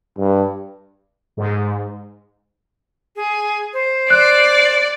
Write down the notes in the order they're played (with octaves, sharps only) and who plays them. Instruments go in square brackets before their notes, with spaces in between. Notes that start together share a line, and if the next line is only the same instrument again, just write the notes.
[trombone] G2
[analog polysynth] G#2
[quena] G#4
C5
[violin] D5 [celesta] F#6